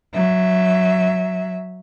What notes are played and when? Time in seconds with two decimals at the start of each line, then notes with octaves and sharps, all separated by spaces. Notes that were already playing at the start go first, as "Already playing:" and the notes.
0.14 F#3 E5